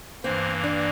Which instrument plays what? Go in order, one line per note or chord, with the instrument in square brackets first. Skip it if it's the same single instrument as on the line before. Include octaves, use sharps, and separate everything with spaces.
[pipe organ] G2 E3 A#3 [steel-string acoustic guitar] C4
[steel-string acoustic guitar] D4